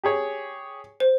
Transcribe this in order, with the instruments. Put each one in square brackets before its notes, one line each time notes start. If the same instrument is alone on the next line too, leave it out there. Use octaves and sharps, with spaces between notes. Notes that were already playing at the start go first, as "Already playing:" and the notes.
[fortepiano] G4 G#4 C#5
[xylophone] C5